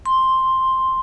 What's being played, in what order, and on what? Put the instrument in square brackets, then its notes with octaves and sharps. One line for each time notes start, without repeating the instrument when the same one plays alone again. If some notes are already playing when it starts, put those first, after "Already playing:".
[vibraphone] C6